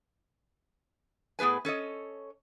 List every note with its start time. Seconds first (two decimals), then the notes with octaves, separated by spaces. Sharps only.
1.39 A2 B3 G#4 B4 G#5
1.65 C#4 A4 C#5 D#5